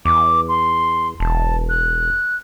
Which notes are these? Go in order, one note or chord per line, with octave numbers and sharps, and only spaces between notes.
E2 D6
C6
E1 A5
F#6